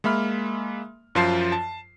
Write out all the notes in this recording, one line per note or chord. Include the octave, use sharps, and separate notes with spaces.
G#3 A#3 E5 B5 F6
F#2 F3 F4 C5 A5 C7
A5